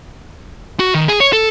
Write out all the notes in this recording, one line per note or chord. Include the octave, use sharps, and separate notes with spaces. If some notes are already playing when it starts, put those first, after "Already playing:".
F#4
D#3
G#4
C#5
A4